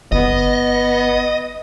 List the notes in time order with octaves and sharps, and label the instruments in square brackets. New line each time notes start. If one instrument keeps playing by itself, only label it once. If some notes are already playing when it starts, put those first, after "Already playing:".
[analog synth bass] G1 [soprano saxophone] B3 [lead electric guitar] D#5